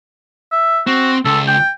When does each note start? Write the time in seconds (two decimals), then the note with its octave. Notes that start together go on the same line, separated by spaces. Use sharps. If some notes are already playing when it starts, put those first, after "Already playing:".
0.52 E5
0.87 C4 F#4
1.25 C#2 A4
1.47 G5